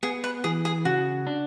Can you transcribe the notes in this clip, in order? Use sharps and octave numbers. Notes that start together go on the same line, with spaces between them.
B3 G#4
B4
E3 G#4
G#4
C#3 F#4
D4